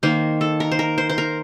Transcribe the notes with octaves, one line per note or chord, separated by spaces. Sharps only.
D#3 A#3 C5
A4
A#4
C5
A#4
C5
C5
A#4